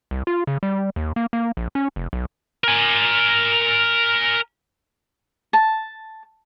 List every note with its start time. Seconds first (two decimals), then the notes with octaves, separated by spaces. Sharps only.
0.11 C2
0.27 F4
0.47 C#3
0.63 G3
0.96 D#2
1.16 A#3
1.33 A#3
1.57 A#1
1.75 C#4
1.96 F1
2.13 B1
2.64 A#4 G#5
5.53 A5